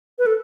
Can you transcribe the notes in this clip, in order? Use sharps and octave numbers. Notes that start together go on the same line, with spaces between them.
B4
A4